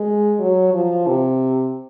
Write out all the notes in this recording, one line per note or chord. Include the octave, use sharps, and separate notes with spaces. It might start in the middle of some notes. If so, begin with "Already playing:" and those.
Already playing: G#3
F#3
F3
C3